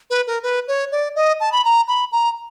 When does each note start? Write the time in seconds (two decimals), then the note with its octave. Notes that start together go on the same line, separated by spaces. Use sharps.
0.10 B4
0.27 A#4
0.43 B4
0.68 C#5
0.92 D5
1.16 D#5
1.40 A5
1.52 B5
1.65 A#5
1.88 B5
2.12 A#5